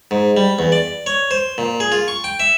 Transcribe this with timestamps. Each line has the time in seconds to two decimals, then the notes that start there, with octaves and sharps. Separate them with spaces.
0.11 G#2
0.37 G3
0.59 E2
0.72 D5
1.06 C#5
1.31 C5
1.58 A#2
1.80 G#4
1.92 F4
2.08 C#6
2.24 G5
2.40 E5